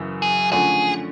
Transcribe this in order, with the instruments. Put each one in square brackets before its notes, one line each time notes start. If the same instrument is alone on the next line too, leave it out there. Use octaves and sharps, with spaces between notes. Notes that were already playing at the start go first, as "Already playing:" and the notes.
Already playing: [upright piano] F#2 C#3 E3
[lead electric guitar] G#4
[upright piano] D3 F3 A3 C#4 [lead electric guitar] G#4